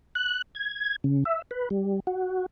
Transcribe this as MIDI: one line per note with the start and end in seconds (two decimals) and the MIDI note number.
0.15 0.42 90
0.55 0.96 92
1.04 1.24 49
1.25 1.42 76
1.51 1.69 71
1.70 2.00 55
2.07 2.46 66